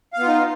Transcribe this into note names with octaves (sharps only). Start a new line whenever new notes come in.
B3 D#4 F4 F5